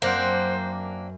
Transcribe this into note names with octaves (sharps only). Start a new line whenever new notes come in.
F#2 A#3 C4 D4 C5 F#5